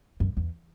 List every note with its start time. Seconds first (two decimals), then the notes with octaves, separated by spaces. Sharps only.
0.20 F#2
0.37 E2